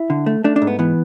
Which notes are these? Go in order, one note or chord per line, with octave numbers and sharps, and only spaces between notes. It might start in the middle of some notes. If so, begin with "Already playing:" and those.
Already playing: E4
D3
A3
A3 D4
D4
G#2
B3
E3 B3